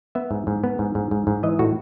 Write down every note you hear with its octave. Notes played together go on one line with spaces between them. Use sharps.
B3 E5
G#2
G#2
B3
G#2
G#2
G#2
G#2
E3 D#5
A2 F#4